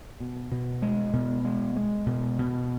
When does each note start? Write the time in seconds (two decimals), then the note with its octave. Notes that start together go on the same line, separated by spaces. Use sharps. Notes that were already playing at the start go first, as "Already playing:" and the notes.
0.20 B2
0.52 B2
0.82 G#3
1.13 B2
1.45 G#3
1.76 G#3
2.06 B2
2.39 B2